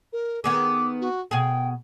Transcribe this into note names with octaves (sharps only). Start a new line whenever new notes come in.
A#4
D#3 B3 G#4 D6
F#4
B2 G#4 G5